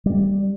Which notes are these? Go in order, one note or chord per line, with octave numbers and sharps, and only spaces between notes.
G3